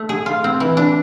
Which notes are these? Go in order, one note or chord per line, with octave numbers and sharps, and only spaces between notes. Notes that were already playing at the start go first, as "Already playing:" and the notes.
Already playing: A3
G#4
F4
C4
E3
D4